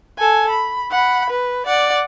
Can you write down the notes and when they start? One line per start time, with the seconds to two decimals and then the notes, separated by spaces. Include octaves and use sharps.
0.18 A4 G#5
0.50 B5
0.91 F#5 B5
1.30 B4
1.67 D5 F#5